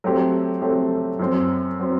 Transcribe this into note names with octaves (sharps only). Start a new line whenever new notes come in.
F#3 A3 C4 G4
F#3 A3 C4 G4
F#2 F#3 C4
F#3 C4